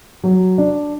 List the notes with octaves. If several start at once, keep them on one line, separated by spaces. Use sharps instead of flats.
F#3
D4